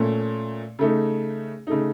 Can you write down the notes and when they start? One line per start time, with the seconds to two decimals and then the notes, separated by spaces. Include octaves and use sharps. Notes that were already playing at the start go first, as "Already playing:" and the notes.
Already playing: A#2 A3 C#4
0.79 C#3 A3 D#4
1.67 C#3 A3 D#4